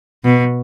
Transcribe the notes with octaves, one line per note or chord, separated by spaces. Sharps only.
B2